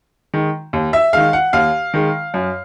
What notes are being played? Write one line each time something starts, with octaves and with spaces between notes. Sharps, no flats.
D#3 G#3
D#2
E5
D#3 G#3 F5
F#5
D#2 F5
D#3 G#3
F#2